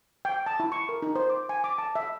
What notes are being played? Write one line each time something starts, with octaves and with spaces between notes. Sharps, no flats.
G5
A5
E4
C#6
A#4
D#4
C5
D6
G#5
D6
A5
E5